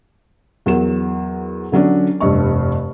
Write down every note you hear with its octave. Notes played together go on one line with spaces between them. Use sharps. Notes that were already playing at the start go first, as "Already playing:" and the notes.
E2 F#3 A#4 E7
D3 F#3 C#4 D4
F1 G2 D#5 C#6